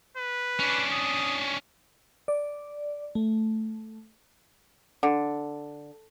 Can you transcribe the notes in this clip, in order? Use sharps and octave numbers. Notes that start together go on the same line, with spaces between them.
B4
C#4 D4
D#6
D5
A3
D3